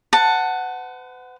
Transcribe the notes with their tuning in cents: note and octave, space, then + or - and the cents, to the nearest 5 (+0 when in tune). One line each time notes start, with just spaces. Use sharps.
B4 +45 F#5 +0 A5 +15